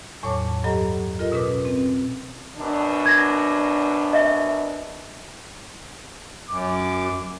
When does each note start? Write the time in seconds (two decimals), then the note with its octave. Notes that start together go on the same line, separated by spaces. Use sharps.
0.23 E2 A2 F#3 C#5 A5 D6
0.64 G2 F#3 G4 A4 D#5 A#5
1.19 F4 A4 A#4 D#5
1.32 B2 C#4 A#4 B4 D6
1.65 C4
2.57 F#2 B2 D4
3.06 G#6 A#6
4.13 D#5 E5
6.50 F#2 D6